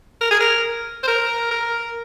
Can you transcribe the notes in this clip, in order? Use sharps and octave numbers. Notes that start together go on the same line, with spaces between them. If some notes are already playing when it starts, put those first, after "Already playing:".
A#4
G#4
A#4
C5
A#4
A#4